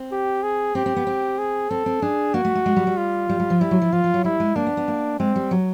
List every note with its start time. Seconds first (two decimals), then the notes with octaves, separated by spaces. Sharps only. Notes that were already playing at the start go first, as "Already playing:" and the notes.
Already playing: C4
0.12 G4
0.43 G#4
0.75 C4 G4
0.86 C4
0.96 B3
1.07 C4
1.39 G#4
1.70 C4 A4
1.86 C4
2.02 D4 G#4
2.34 A#3 F#4
2.45 A3
2.55 A3
2.66 G#3
2.76 G3
2.87 G3
2.97 F4
3.29 G3
3.40 G3
3.50 F3
3.61 G3 E4
3.71 F#3
3.82 F3
3.92 F3 F4
4.04 F3
4.14 F#3
4.24 G3 E4
4.40 G#3
4.56 A#3 D4
4.67 B3
4.77 B3
4.88 A#3
5.19 G#3 C4
5.35 G3
5.51 F#3